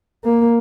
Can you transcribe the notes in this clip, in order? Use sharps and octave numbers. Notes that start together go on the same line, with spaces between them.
A#3